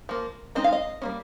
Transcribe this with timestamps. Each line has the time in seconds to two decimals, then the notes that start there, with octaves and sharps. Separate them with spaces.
0.09 F3 A#3
0.55 G#3 C4 D#4 D#5
0.64 F5
0.72 D#5
1.02 G3 A#3 C#4